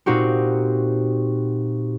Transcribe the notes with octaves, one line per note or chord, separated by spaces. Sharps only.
A#2 C4 D#4 F#4 G4